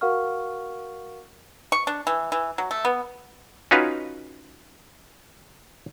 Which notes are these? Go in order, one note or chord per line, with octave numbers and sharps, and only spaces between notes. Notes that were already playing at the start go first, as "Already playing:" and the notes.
F#4 A#4 F5 F#5 C#6 F6
C#6
D4
E3
E3
F#3
A3
B3
C#4 D#4 F4 F#4 B4